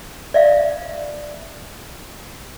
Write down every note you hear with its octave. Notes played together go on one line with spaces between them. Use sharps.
D5 E5 F5